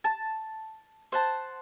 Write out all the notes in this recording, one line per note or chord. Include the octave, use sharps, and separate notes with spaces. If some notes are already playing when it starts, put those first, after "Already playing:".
A5
C5 F#5 A5